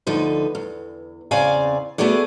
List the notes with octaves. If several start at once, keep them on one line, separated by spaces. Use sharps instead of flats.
D2 D3 F3 D#4 B4
E2
E2 C#3 C4 D5 F5 G#5
A3 B3 F#4 G#4 D5